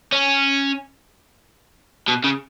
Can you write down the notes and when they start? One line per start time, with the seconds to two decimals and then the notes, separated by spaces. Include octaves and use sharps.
0.13 C#4
2.08 B2
2.24 C#3